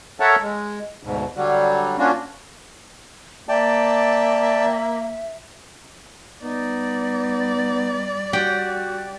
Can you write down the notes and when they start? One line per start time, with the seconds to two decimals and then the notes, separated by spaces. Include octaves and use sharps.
0.20 A4 A#4 C#5 E5 F#5 A5
0.41 G#3
1.03 D2 G#2 B2
1.36 D3 F#3 G3
1.98 A#3 C#4 D4 F4 F#4
3.49 A#3 D5 E5 G5 A5
6.43 G3 B3 D#4 D5
8.33 F#4 G4 F#5 G5